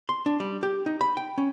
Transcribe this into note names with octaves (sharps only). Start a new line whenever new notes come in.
C6
D4
G3
G4
D#4
B5
G5
C#4